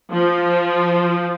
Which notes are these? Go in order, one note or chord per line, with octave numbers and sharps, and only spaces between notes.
F3